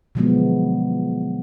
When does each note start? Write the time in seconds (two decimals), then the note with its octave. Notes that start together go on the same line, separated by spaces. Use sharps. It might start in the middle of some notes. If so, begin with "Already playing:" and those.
0.15 B2 D3 F3 F#3 G#3 B3